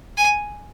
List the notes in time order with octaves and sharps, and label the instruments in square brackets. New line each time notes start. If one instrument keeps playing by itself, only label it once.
[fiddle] G#5